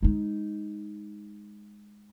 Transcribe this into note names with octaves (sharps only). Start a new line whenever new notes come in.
G#3 D#4